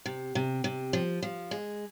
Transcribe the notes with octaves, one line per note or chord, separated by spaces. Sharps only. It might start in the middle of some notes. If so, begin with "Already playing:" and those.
C3
C3
C3
F3
F3
G#3